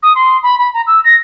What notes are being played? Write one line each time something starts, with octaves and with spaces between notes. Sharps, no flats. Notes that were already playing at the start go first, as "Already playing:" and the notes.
D#6
C6
B5
B5
A#5
E6
A#6